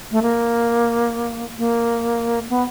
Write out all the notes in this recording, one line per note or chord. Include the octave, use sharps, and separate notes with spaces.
A3
A#3
A#3
B3